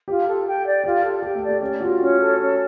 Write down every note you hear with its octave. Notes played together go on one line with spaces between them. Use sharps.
F4 G4
A4
G5
D5
F4 G4
A4
G4 G5
A3 A4
D5
A3 A4
C#4 G4
F4 F#4
C#4
A4
C#4